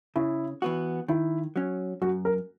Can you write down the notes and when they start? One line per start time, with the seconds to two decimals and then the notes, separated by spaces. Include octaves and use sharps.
0.16 C#3 E4
0.62 E3 B3 F#4
1.08 D#3 E4
1.56 F#3 C#4
2.02 F#2 F#4
2.25 A#4